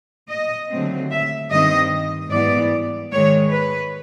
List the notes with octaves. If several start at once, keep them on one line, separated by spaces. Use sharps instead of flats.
D#5
D#2 D3 F#3 A3 C4
E5
G2 D#3 G3 C4 D#5
G#2 E3 G3 B3 D5
G#2 D#3 G#3 C#5
B4